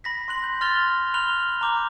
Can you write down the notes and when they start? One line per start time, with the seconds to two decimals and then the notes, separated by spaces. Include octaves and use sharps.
0.04 B5 A#6 B6
0.28 C6 F#6 F#7
0.44 G6 B6
0.61 C6 F6 A6 F7 G7
1.14 B5 F6 F#6 F7 G7
1.61 A#5 D6 G6